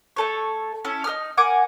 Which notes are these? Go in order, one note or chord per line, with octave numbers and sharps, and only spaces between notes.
A3 A4 C#5
C#4 E4 A4
D#4 A#4 D#6 F6
A#4 F#5 G#5 D6